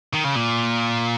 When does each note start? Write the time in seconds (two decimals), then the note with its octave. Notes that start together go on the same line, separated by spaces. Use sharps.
0.14 D#3
0.25 C#3
0.36 A#2